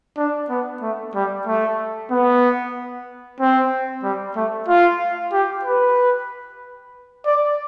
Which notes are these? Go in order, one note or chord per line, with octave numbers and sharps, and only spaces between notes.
D4
B3
A3
G3
A3
B3
C4
G3
A3
F4
G4
B4
D5